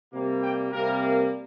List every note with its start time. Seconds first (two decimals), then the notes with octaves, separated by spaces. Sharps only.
0.13 C3 G3 A#3
0.42 G5
0.72 C3 G3 A#3 A#4